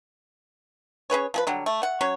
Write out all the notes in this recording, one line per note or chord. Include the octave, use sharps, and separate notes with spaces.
C#4 G#4 B4 C#5
F3 G#4 B4
D3 F#3 G3
A3
F#5
F#3 C#4 C#5